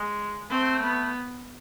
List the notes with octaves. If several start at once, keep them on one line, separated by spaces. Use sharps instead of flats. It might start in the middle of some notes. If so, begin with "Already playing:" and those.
Already playing: G#3
A3 C4
B3